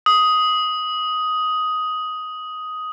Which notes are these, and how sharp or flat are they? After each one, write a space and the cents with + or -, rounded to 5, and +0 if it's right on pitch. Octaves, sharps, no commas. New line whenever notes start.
D#6 +10